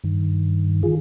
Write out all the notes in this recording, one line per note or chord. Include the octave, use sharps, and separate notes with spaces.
G2 D#3
D#3 F4 G#4